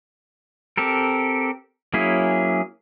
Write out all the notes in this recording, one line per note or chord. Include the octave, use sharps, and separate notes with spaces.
C4 G4 A4 A#4
F#3 A#3 C#4 E4 G#4